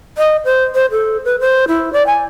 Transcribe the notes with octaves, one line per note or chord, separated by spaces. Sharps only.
D#5
C5
C5
A4
B4
C5
E4
D5
G#5